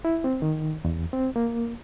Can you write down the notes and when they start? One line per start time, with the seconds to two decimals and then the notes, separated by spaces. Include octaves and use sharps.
0.05 E4
0.24 C4
0.42 D#3
0.85 E2
1.13 C4
1.36 A#3